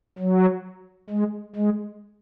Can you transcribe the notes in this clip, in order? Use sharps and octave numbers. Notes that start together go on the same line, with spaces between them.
F#3
G#3
G#3